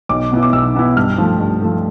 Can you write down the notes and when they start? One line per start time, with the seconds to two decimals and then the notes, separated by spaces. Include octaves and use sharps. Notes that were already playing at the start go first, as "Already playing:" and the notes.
0.09 B1 D6
0.32 B2 B3 E4
0.43 D6
0.53 B1 E6
0.75 B2 B3 E4
0.97 G2 F6
1.18 F3 A3
1.40 G2
1.62 F3 A3